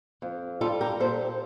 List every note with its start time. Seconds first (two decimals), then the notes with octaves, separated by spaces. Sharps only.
0.22 F2
0.61 G3 F4 A4
0.81 G4 A#4
1.00 A#2 A4 C5